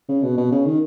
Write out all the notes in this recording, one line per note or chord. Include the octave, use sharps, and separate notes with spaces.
C#3
B2
B2
C#3
D#3